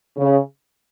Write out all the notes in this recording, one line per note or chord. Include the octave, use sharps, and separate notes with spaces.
C#3